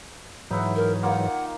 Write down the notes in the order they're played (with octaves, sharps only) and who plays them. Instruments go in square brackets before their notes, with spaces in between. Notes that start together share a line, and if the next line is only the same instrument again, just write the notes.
[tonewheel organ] G#2 E3 F#3 [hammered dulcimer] D#4 E4 F#5
[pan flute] A#4
[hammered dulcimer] D#3 A#3 F4 [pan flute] F#5